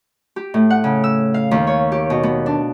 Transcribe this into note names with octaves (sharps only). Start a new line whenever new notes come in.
G4
A2
F#5
C#3
E6
F5
D#2
C#5
G4
B2
B3
D4